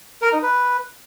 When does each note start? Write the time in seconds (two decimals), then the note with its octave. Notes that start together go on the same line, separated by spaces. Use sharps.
0.22 A#4
0.32 D#4
0.42 B4